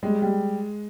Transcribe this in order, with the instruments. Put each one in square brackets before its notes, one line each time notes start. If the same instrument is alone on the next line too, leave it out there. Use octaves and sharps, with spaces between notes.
[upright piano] G3 [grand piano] G#3
[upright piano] G3